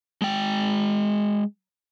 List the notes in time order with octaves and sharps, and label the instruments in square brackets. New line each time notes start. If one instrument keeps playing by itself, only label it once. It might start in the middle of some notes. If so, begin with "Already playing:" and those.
[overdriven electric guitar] G#3 G5